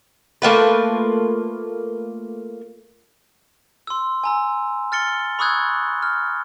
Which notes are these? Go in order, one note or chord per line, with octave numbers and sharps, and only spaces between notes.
A3 A#3 F4 B4
C6 E6
G#5 A#5 E6
F6 A6 C#7 G7
B5 C#6 D#6 E6 F#6 G#6
F6